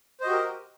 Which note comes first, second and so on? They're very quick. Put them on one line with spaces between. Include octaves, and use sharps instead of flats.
C5 D#5 F#4 G4 A#4